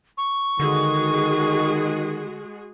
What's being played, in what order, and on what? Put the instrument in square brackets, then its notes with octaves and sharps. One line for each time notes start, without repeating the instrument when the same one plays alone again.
[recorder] C#6
[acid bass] D3 [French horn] D#3 [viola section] G#3 F#4 G#4